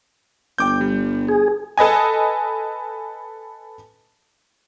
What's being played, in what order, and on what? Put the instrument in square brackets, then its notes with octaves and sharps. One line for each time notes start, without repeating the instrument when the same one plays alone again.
[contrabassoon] G1 [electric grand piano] G5 D6 G6
[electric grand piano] G3
[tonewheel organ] G#4
[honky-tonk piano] A4 B4 D#5 G#5